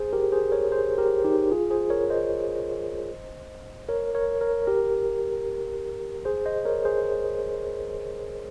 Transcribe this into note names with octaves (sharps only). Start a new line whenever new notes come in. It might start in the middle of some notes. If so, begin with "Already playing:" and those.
Already playing: G#4 C5
G4 A#4
G#4 C5
A#4 C#5
G#4 C5
G4 A#4
D#4 G4
F4 G#4
G#4 C5
A#4 C#5
C5 D#5
A#4 C#5
A#4 C#5
A#4 C#5
G4 A#4
G#4 C5
C5 D#5
A#4 C#5
G#4 C5